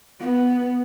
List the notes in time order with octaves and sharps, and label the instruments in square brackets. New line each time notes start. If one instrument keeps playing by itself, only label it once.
[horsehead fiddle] B3